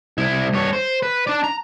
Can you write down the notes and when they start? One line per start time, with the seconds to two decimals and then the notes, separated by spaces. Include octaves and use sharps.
0.18 C2 E4
0.53 G2 C#5
0.73 C5
1.03 B4
1.27 D4 D5
1.44 A#5